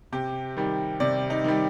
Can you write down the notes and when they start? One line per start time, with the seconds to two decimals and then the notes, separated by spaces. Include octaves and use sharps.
0.12 C3 G4
0.57 D#3 G3
1.00 C3 D5
1.30 D#4
1.44 D#3 G3